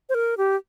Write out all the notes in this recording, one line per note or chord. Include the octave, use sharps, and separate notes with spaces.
C5
A#4
G4